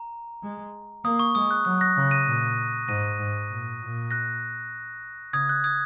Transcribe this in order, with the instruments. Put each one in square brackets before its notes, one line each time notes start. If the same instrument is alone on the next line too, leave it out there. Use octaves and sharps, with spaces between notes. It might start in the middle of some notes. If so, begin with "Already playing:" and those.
Already playing: [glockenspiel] A#5
[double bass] G#3
[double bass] A#3 [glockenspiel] D#6
[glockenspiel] C#6
[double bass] G#3 [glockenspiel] D#6
[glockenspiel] F#6
[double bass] F#3 [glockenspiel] F#6
[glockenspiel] F#6 A#6
[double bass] C#3
[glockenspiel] A#6 D#7
[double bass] A#2
[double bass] G#2 [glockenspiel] A#6 D#7
[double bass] G#2
A#2
A#2
[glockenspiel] F#6 A#6
[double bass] C#3 [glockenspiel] D#6 G#6
[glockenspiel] F#6
D#6 G#6